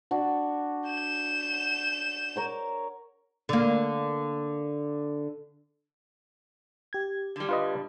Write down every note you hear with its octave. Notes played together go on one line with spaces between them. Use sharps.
D4 F#4
G6 E7
A#4 C#5 D6
D3 A#3
G4 G#6
D3 G3
F4 B4 D#5